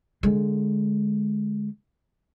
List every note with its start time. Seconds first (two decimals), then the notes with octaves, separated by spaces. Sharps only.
0.23 D3 G#3